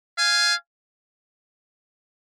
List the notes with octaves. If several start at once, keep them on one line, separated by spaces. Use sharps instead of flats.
F5 G#5